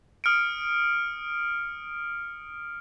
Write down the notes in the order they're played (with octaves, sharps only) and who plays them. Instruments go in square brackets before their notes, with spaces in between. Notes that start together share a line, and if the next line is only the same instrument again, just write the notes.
[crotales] D#6 F6 C#7 D7